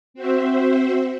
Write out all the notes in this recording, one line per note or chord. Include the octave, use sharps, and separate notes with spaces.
C4 F#4 C5 E5